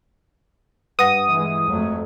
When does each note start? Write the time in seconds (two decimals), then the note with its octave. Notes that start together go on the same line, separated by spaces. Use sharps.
0.99 G2 B4 F#5 D#6 A#6
1.29 E3 G#3
1.67 F2 F#3 A3